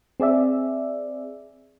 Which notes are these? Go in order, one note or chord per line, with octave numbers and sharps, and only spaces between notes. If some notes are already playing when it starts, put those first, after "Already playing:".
C4 G#4 D5 E5